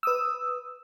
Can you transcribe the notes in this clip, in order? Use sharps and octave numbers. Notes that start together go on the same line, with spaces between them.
B4 D#6 E6